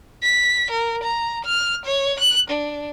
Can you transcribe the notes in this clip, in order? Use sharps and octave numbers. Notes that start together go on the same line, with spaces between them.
B6
A#4
A#5
F6
C#5
F#6
D4